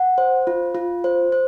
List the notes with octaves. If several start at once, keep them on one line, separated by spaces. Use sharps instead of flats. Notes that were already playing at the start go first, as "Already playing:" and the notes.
Already playing: F#5
C5
F4
F4
C5
C5